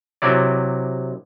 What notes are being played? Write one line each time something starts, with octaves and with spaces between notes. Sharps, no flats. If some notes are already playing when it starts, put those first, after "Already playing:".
C3 F#3 E4 D5